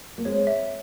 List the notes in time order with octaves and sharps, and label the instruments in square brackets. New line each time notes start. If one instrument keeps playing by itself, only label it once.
[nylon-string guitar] A#3
[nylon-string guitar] G#3 C4 [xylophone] C#5
[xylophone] E5